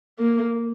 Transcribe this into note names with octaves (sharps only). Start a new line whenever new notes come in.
A#3